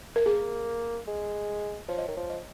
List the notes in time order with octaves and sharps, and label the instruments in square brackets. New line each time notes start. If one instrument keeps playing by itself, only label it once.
[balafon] A#4
[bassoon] A#3 [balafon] G#4
[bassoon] G#3
[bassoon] F3 [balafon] C#5
[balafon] D#5
[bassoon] D#3 [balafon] C#5
[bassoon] F3
[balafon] D#5